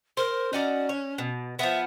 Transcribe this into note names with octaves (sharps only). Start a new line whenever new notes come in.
A#4 C5
C#4 D#4 F#4 D5
C#5
B2
F3 B3 E5